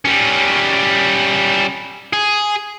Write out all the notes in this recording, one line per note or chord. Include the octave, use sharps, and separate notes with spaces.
G3 C#4
G#4